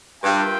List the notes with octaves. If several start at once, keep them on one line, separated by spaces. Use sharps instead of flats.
G2 F4 A#4 E5 G5